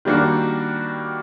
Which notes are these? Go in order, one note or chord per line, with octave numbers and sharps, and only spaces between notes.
D#3 G3 A#3 D4 F#4